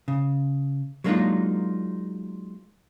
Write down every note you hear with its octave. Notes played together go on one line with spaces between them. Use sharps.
C#3
F#3 G#3 A#3 D4 D#4 F4